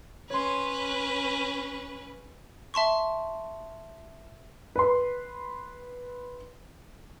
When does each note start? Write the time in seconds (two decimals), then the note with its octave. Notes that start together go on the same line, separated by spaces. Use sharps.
0.30 C#4 B4 C#5 C6
2.74 E5 A5 C6 C#6
4.76 B4 C6